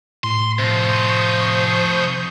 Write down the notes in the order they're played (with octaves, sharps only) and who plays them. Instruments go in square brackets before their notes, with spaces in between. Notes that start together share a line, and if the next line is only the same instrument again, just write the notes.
[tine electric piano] A2 [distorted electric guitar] C6
[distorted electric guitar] C3 F3 [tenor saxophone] C5 [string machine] C#6 D#6 G6